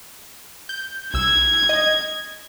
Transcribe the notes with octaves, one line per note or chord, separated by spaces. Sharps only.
G6
C2 E6 G#6
D#5